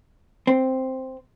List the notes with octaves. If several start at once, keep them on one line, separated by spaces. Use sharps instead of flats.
C4